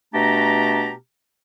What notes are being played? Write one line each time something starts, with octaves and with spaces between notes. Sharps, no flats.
B2 A3 D4 G4 A5 A#5